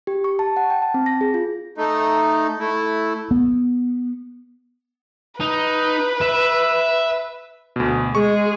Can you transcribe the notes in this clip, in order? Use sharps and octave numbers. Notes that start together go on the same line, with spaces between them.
G4
C#6
A5
F#5
G5
A5
C4
A#6
G#4
F4
A3 D#4
A3 E4
B3
D#4 B4
E5
D2 B2
G#3 G#4 C#6